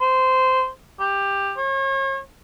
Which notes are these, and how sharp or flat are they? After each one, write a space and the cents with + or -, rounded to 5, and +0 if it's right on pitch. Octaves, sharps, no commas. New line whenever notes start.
C5 -15
G4 +15
C#5 -40